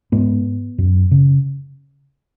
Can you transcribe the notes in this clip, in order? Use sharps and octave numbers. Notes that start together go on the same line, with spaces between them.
G#2 B3
F#2
C#3